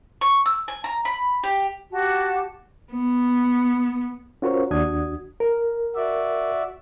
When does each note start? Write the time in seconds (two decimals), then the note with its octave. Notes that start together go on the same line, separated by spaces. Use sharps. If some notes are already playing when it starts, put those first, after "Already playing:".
0.21 C#6
0.46 E6
0.68 G#5
0.84 A#5
1.05 B5
1.44 G4
1.92 F#4 G4 F#5 A5
2.92 B3
4.42 C#4 F4 F#4 A#4 C5 C#5
4.71 D#2 D4 F#4 D#6 G#6
5.40 A#4
5.96 F#4 D5 E5